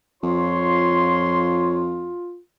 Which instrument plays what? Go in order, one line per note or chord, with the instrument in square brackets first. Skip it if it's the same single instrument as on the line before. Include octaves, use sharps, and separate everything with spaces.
[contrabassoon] F2 [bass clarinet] F4 [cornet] C#5 [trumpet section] C6